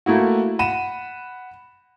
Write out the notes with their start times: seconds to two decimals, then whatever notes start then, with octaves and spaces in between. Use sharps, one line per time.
0.06 A3 A#3 E4 F#4
0.59 F#5 B5 D#7 E7